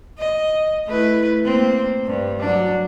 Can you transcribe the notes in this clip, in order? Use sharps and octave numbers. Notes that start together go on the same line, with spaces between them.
D#5
A3 E4 B4
A#3 C4
G2
F#3 D4